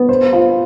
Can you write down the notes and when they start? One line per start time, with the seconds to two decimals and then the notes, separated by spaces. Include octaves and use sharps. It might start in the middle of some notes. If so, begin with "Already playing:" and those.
Already playing: B3
0.09 C5
0.33 F4